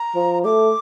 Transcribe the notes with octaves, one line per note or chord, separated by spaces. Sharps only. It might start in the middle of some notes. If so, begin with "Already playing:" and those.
Already playing: A#5
F3
A3 D6